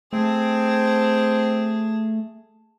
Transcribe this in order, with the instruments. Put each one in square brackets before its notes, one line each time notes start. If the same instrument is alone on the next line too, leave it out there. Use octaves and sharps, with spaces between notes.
[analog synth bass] A3 [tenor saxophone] C4 [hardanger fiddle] G#4 A5